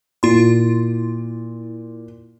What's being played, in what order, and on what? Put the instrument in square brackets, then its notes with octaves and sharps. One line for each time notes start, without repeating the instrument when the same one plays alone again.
[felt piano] A#2 [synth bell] E4 C6